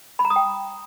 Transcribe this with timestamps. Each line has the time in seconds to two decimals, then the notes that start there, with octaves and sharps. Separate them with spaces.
0.19 B5
0.25 A#5
0.30 D#6
0.36 G5